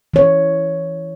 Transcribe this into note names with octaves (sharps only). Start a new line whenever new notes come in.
E3 C#5